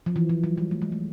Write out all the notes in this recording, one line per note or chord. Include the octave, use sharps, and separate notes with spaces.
F3
E3
F3
F#3
G3
A3
G#3
A3